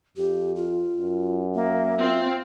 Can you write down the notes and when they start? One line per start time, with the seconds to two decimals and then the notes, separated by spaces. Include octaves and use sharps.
0.17 F2 G4
0.56 F4
0.98 F#2
1.55 A#3 E5
1.99 C4 F4